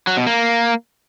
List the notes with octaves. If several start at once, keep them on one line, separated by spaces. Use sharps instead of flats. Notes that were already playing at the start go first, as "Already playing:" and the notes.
F#3
B2
A#3